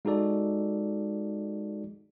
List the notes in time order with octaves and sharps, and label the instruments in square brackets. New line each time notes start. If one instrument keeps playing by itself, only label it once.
[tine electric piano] G#3 D#4 F#4 A4 D5